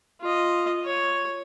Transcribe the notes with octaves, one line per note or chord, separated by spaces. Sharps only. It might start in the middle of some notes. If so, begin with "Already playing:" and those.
F4 D#5
C#5